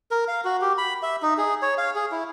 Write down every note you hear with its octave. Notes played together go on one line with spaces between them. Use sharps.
A#4
F5
F#4
G4
B5
E5
D#4
G#4
C#5
F5
G#4
E4